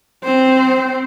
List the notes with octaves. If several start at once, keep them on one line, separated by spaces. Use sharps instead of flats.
C4 C5